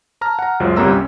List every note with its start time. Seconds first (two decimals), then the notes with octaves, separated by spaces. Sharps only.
0.21 A5 A#5 F6
0.39 F#5 A#5
0.60 C#2 F#2 F4 C5
0.76 G1 C2 C3 A#3 A#5 E6
0.91 C#4